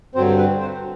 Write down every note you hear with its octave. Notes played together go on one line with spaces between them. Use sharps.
G2 D3 F#3 C4 C5
B4
C5